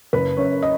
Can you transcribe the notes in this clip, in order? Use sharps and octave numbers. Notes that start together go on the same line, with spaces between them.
F#1 B4
F#2 C#5
D#5